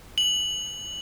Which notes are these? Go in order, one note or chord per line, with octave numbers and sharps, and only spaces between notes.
F#7